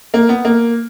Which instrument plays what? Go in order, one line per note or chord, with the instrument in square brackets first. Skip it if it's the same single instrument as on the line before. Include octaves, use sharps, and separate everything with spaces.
[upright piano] A#3
B3
A#3